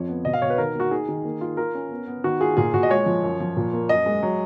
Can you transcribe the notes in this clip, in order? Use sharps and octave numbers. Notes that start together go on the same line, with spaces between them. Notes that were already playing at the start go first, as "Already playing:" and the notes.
Already playing: F2 F3 C#5
B3
B2 D#5
F5
B2 C#5
B4
D#3 A#4
A#3 F#4
D#4 G#4
D#3
A#3
F4
F4 A#4
C#4
B3
B3
D#3 F#4
F4 G#4
A#2 G#4
A#2 F#4
D#5
G#3 C#5
F3
F#2
F3
A#2
A#3
F#2 D#5
G#3
F#3